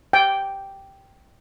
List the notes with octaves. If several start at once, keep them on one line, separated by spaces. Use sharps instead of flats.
G5